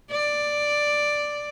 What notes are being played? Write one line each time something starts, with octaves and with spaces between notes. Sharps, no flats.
D5